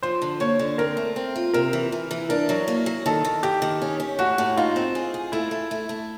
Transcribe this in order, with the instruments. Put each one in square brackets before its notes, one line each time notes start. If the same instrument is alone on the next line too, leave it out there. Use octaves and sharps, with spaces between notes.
[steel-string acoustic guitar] F3 [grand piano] C5
[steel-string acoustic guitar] D3
[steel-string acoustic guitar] A#3 [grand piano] C#5
[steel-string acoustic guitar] D3
[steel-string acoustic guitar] C4 [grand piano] A#4
[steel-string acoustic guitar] A3
C4
F4
[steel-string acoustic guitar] C3 [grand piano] A#4
[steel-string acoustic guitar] E3
E3
E3
[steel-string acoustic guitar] D4 [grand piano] A#4
[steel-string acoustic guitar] F#3
A#3
F#3
[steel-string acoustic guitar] D#3 [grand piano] A4
[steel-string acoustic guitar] D#3
[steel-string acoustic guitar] D#3 [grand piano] G4
[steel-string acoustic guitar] D#3
C#4
C#4
[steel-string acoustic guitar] A2 [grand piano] F#4
[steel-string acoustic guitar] A2
[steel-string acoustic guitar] D#4 [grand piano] F4
[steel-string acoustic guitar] C4
G#4
G#4
[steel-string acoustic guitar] A3 [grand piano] E4
[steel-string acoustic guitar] A3
A3
A3